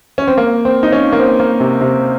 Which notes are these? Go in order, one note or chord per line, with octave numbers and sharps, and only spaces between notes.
C#4
C4
A#3
C4
D#4
C#4
A#3
C4
A#3
C3
C3